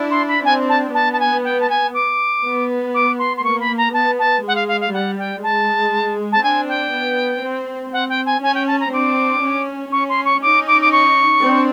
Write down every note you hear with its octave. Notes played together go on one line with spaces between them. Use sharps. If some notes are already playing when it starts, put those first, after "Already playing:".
Already playing: D4 E4
C6
B5
C4 D4 G#5
A5
B3 A5
A5
G#5
G5
A5
G#5
D6
B3
D6
C6
C6
A#3 C#6
B5
A#5
B3 A5
A5
G#3 F#5
F5
F5
F5
G3 F#5
G5
G#3 A5
A5
C4 D4 G#5
G5
B3
C4
C4 F#5
G5
G#5
C#4 G#5
G5
A5
A#5
C4 D4 D6
C#4
C#4 C#6
C6
C#6
C#4 D#4 D6
D6
D6
C#6
C4 D4